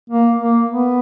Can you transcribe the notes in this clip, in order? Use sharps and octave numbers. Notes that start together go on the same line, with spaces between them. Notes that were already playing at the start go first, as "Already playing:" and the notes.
A#3
A#3
B3